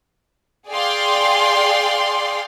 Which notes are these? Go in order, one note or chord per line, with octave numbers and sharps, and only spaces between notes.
G#4 D5 F5 G5 C6